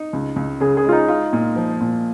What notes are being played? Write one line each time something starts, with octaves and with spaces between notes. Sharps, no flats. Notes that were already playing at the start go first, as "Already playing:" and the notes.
Already playing: D#4
C#2
C#2
C#3 G#4
G#4
G#3 F4
D#4
F4
A#2
F3
A#2